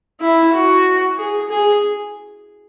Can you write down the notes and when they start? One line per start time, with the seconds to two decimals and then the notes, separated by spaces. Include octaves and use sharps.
0.20 E4
0.53 F#4
1.17 G#4
1.49 G#4